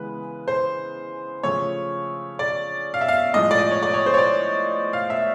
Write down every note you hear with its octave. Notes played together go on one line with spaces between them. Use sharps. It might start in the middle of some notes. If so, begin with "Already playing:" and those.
Already playing: C#3 E3 G#3 B3 B4
C5
C#3 F3 A3 C#5
D5
F5
E5
F5
A2 F3 G#3 D#5
D5
D#5
C#5
D5
C#5
C5
C#5
D5
F5
E5